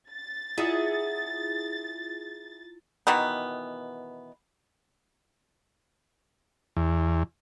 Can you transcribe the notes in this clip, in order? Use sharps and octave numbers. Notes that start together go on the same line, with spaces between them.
A6
E4 F4 G#4 E5 F#5
B2 D#3 E3 B3
E2